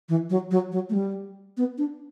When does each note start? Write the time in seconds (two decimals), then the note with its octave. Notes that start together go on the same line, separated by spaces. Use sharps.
0.09 E3
0.30 F#3
0.51 F#3
0.72 F#3
0.89 A3
0.93 G3
1.57 B3
1.78 D4